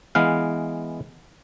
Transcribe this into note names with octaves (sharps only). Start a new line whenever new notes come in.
E3 G#3 B3 F5